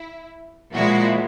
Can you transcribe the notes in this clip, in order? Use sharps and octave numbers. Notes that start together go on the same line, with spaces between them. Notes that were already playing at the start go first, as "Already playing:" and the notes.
Already playing: E4
A#2 F3 G#3 E4 F#4